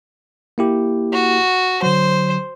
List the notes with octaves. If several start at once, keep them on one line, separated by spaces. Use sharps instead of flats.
A#3 E4 G4
F#4
D3 F#3 C5